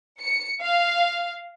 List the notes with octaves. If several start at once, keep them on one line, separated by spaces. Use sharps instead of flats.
C#7
F5